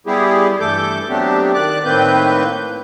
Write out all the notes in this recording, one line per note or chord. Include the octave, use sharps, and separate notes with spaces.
G3 B3 E4 G4 G#4
G2 E3 A3 A4 D6 G6
F#3 A3 B3 C4 D4 G4
D#3 D5 D6 F#6
A2 D#3 A#3 C4 B4 G6